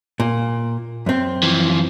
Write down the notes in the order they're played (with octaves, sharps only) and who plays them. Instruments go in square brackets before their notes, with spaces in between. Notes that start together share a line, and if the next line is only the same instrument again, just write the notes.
[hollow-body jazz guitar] A#2
F#2 C4
[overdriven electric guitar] E3 F3